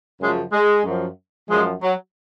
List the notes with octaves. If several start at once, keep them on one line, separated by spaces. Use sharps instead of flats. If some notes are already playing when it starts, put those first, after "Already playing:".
F#2 C#3 F3 G#3
G#3
F#2 F3
F#2 F3 G#3
F#3